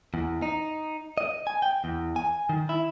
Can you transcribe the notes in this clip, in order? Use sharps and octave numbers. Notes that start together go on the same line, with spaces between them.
E2
D#4
D#5
G#5
G5
E2
G#5
D#3
E4